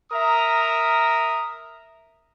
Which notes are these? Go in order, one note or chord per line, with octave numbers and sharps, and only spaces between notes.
A#4 E5 A#5 D#6